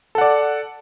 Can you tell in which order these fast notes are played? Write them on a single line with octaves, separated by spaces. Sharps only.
A4 F#5 D5